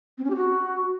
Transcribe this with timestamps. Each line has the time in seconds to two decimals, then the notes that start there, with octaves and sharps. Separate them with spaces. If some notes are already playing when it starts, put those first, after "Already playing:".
0.18 C4
0.24 C#4
0.30 G4
0.36 F#4